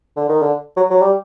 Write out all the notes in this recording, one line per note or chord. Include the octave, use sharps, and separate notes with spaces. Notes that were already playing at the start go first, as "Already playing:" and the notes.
D3
D#3
D3
F#3
F#3
G3